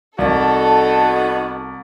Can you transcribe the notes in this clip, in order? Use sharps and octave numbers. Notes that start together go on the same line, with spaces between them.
C2 B3 D#4 F#4 A4